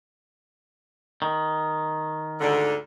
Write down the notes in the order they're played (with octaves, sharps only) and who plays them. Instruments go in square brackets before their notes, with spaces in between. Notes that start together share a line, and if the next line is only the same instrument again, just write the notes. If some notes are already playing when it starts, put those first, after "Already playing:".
[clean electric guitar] D#3
[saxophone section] D2 G#2 D3